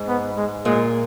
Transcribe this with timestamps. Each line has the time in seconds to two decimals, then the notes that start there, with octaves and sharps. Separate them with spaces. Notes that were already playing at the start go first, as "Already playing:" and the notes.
Already playing: G#2
0.08 B3
0.37 G#3
0.65 A#2 G#3